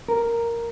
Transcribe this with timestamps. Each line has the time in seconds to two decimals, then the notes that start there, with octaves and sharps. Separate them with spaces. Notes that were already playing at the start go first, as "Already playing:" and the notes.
0.08 A#4